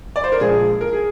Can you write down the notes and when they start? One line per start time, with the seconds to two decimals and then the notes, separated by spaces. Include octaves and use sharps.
0.16 D5
0.24 C5
0.32 A#4
0.40 A#1 A#2 F3 G#3 G#4
0.81 A#4
0.93 G#4